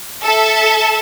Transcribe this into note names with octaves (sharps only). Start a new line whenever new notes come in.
A4 E5